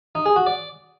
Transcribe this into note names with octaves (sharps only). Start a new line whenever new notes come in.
D#4
G#4
F#4
D5